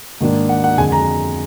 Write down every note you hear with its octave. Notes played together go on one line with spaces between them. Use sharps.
G#2 D#3 A#3 D4
F#5
F#5
F2 D3 G#3 G#5
A#5